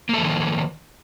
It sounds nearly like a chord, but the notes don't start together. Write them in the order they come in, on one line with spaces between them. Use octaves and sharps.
A#3 A4 F3 D#3